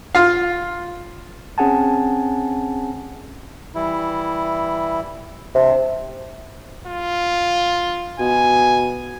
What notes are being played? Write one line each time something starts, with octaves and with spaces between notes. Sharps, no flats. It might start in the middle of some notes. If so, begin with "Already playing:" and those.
F4 F5
C4 C#4 G#4 F#5 G#5 A5
E3 G3 E4
C3 D4
F4
B2 G#5